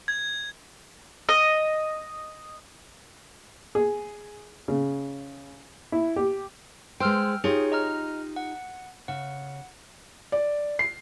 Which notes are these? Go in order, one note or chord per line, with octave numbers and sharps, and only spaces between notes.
G#6
D#5
G#4
C#3
E4
G4
G#3 C5 G5 E6 F6
D#4 F4 G4 G#4 C#5
D#5 A#5 F6
F#5
C#3 F#5
D5
C7